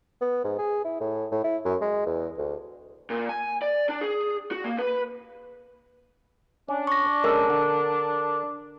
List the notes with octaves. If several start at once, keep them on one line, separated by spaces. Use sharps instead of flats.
B3
G#2
G#4
E4
A2
A2
E4
F#2
G#3
E2
D2
A#2
G#5
D5
D4
G#4
F#4
A#3
B4
C#4 D4
C#6 A#6
G#3 C#4 A4 A#4
D3